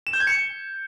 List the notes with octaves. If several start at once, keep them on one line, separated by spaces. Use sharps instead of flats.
E7
G6
G#6
C#7